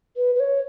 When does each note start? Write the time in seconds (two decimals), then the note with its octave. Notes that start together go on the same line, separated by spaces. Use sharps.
0.17 B4
0.35 B4
0.40 C#5